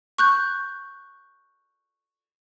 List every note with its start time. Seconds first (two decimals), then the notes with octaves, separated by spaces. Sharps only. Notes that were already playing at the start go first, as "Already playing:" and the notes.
0.19 C#6 F#6 G6